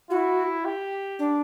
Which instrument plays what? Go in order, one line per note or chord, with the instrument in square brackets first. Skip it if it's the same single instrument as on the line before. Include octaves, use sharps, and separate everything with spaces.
[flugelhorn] E4 [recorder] F#4
[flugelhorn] G4
[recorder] D4